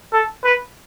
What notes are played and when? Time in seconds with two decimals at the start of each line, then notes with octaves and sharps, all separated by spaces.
0.12 A4
0.44 B4